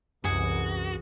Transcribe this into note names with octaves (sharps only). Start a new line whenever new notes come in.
C2 F#2 E3 F#4 G#4